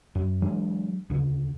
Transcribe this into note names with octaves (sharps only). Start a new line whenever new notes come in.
F#2
E3 F#3 G#3 D4
D2 C#3